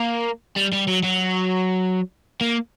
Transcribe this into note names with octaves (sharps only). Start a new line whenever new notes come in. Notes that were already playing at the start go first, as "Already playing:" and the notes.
Already playing: A#3
G3
G3
F#3
F#3
A#3